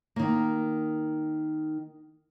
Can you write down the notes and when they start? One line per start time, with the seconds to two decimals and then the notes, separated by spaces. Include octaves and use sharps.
0.16 D#3 A#3